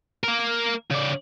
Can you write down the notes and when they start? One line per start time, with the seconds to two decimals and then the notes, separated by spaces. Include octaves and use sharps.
0.24 A#3 A#4
0.90 C#3 D5